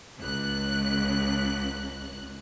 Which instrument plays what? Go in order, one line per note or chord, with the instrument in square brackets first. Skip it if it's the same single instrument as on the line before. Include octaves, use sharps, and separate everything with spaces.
[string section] C#2 F#6